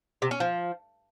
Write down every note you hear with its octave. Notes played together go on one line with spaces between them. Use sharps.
C3
C#4
F3